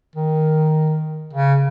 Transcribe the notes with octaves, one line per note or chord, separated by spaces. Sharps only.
D#3
C#3